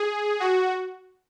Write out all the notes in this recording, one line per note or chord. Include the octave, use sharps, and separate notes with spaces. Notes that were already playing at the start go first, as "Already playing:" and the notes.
Already playing: G#4
F#4